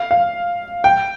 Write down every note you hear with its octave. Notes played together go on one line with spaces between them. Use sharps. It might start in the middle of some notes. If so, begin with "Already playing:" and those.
Already playing: F5
F5
G5